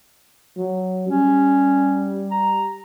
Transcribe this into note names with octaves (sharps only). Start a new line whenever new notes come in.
F#3
G3 C#4
A#5